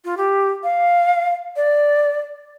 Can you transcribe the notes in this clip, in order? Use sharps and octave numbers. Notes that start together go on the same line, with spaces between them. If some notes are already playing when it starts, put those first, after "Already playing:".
F4
G4
F5
D5